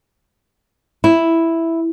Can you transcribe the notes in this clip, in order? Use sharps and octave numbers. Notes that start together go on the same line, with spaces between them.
E4